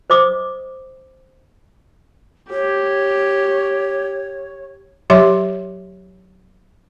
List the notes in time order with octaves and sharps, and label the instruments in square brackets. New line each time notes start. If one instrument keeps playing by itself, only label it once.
[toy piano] C5 D#5 D6 D#6
[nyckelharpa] G4 [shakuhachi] C#5
[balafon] F#3 G4 C#5 E5 C6 D6